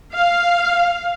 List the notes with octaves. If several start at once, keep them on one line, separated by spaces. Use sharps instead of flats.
F5